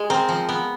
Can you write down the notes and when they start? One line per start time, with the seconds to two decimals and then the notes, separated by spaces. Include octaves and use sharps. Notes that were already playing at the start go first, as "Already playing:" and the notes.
Already playing: G#3
0.10 C4 A#4
0.29 F3
0.49 B3